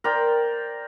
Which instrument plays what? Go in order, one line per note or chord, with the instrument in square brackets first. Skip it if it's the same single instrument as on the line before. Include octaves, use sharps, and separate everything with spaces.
[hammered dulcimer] A#4 C5 D5 G5